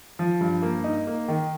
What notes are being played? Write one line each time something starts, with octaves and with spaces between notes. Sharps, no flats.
F3
G2
A#3
D#4
A#3
D#3